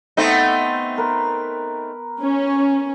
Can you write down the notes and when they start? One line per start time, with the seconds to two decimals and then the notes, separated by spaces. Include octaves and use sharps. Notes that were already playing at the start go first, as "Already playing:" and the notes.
0.17 A3 B3 C4 D#4
0.98 A#4 B4 C6
2.19 C#4